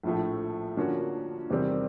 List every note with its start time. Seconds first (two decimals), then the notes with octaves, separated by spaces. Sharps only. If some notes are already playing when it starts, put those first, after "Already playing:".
0.04 A#1 A2 F3 A3
0.77 D3 F3 A#3 C#4 F#4
1.50 E2 C3 D#3 G3 C4